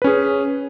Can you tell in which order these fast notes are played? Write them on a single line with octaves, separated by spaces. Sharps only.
B4 C#4 G#4